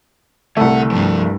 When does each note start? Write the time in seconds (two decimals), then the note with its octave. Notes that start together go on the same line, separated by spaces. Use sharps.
0.57 C2 D3 A3 F#5
0.91 G2 F3 C4